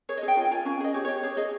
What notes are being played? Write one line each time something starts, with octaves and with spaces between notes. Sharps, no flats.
G#4 C#5
D#5
G#4 G5
F4 G#5
F4 G#5
C#4 G#5
G#4 D#5
G4 C#5
C#5
G4
G#4 C#5
G#4 D#5